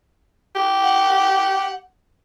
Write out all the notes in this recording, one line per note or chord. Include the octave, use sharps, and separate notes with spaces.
G4
F#5